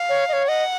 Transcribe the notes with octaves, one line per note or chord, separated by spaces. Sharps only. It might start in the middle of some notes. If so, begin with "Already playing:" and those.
Already playing: F5
C#5
D#5
C#5
D#5 F#5